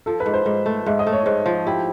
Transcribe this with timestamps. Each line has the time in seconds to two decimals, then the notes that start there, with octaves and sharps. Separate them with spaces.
0.06 F3 A4
0.20 B4
0.26 G#2
0.34 C5
0.46 G#2
0.66 A3
0.86 G#2 E5
0.99 D#5
1.07 A3
1.12 C#5
1.26 G#2 C5
1.46 F3
1.67 E4 G4